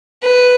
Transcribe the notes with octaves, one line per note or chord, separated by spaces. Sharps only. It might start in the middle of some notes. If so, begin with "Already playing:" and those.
B4